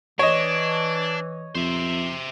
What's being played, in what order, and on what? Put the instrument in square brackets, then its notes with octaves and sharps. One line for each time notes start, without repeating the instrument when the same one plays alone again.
[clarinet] E3 [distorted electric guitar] D4 [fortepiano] C#5 D#5
[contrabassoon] F2 [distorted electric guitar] C5 E5